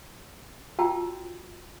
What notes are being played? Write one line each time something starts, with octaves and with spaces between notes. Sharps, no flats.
F4 F#4 G5 A5 E6